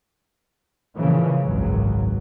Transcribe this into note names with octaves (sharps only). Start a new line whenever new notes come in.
A#2 C#3 E3 F3
G#1 C#2 F#2 C#3 F#3